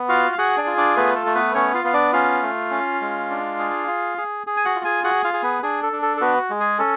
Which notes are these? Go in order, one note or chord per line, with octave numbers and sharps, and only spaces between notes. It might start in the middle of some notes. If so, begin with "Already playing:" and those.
Already playing: B3
F4 F#4 F5
F5
F#4 G#4 F#5
D4 D5
F4
D4 D5
A3 B3 B4
A4
A3
B3 B4
B3 C#4 C#5
F4 F5
B3 F5
D4 D5
C#4 F4 F5
A3
C#4
G#3
D4
G#4
F4
G#4
G#4
G#5
F#4 F#5
F4
G#4 G#5
F#4 G#4 F#5
F4 F5
G#4
B3 B4
D4 G#4
A4
D4
A4
A4
B3 F#4 B4
G#3
G#4
C#4 A4